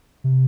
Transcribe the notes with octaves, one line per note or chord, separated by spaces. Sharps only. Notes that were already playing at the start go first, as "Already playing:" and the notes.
C3